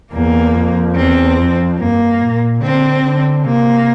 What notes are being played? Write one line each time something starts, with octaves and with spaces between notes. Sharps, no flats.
E2 A#3
F2
E2 C4
F2
G2 A#3
A#2
D3 C4
D3
C3 A#3